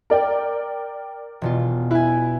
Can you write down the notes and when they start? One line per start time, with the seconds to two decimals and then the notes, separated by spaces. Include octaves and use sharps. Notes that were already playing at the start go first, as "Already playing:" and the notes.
0.10 A#4 D5 G5
1.42 E1 B2 F4
1.91 E4 B4 G#5